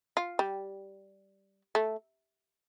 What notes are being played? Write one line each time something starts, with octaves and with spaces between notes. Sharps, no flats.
F4
G3
A3